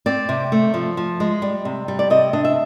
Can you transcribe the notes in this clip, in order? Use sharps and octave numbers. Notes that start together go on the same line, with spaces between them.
C4 D5
C3
A3
F3
F3
G#3
G3
C3
G3
D5
C3 D#5
D4 D#5
E5